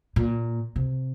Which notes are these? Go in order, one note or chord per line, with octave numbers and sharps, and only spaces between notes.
A#2
C3